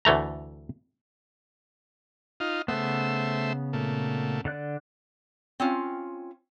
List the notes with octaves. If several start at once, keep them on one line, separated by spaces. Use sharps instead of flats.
D2 E3 A3 A#5
D#4 F4
C#3 A3 B3 C5 E5
A#2 A3
D3 D5 F#6
C4 C#4 F4